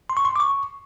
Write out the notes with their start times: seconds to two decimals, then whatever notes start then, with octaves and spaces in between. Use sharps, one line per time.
0.10 C6
0.17 C#6
0.25 C6
0.36 D6
0.40 C#6